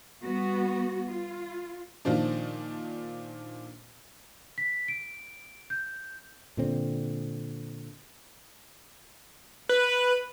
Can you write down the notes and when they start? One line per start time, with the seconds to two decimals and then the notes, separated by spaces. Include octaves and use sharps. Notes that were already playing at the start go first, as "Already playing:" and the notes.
0.23 G3 B3 F#4
1.09 F4
2.05 A#2 D#3 F3 D4
4.58 B6
4.88 D7
5.70 G6
6.57 A#2 D3 C4
9.69 B4